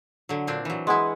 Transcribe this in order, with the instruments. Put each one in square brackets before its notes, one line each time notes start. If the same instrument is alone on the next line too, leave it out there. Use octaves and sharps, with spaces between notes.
[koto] D3 F#3
A#2 C4 D4
E3 F#3
[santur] G#3 F#5 G#5 [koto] B3 E4